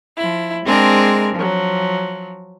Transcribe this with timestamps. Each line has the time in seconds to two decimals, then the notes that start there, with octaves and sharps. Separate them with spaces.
0.18 F3 E4
0.65 G#3 C4 D4 G#4 A#4
1.35 F3 F#3